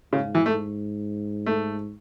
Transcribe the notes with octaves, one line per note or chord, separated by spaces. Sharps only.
G#2 C#3
E3
A3
A3